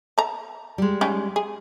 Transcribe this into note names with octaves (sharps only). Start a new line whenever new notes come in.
A5 A#5
G3 G#3
C#4 D#4 G5
G#4